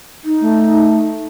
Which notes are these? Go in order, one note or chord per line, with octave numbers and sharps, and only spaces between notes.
D#4
A3